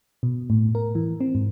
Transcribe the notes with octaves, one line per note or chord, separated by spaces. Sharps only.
B2
A2
A#4
E3
C4
G#2